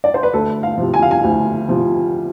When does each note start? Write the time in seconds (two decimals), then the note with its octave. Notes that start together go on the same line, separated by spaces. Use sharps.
0.04 D5
0.14 C5
0.23 B4
0.33 D2 A4
0.63 F5
0.78 C3 F3
0.94 G#5
1.02 F5
1.11 G#5
1.24 D2
1.68 C3 F3